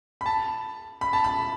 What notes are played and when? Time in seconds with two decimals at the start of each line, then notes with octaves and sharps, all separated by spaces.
0.21 B5
0.26 A5
1.01 B5
1.13 A5
1.24 B5